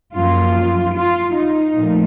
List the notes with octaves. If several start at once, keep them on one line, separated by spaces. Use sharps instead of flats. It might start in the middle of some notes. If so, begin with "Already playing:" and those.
F#2 F3 A#3 F4
F4
D#4
A#2 F3 A3